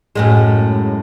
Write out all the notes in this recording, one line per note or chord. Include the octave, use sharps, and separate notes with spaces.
F#2 A2 G#3